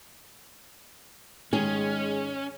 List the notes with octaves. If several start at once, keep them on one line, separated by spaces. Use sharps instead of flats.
G#2 D#3 G#3 C#4 G#4